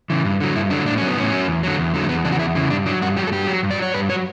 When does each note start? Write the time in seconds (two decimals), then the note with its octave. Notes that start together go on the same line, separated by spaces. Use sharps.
0.10 C#3 E3
0.25 G2
0.40 D3 F#3
0.55 G2 E4
0.70 D3 F#3 D4
0.86 A2 D4
0.97 F#3 C#4
1.08 B3
1.17 A2 C#4
1.33 F#3
1.48 E2
1.63 D3 F#3
1.79 E2
1.94 D3 F#3
2.04 A3
2.09 E2 B3
2.25 C#3 E3 D4
2.32 F#4
2.39 E2 E4
2.55 C#3 E3
2.70 G2 D4
2.86 F#3 D4
3.01 G2 F#4
3.17 F#3 G4
3.27 A4
3.32 G2 G4
3.47 F#3
3.63 G2
3.71 D5
3.78 F#3 C#5
3.94 G2 B4
4.09 F#3 C#5